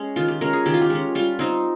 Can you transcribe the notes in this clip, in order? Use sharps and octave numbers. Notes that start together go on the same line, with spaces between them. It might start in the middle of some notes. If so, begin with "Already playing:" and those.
Already playing: G#3 C#4
D#3 F4
G4
G#3 C#4 A#4
G#4
D#3 G4
F4
G4
G#3 C#4
G3 F4
C4 D#4